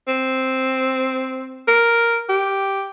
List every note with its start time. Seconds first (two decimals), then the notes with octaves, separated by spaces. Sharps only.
0.08 C4
1.68 A#4
2.29 G4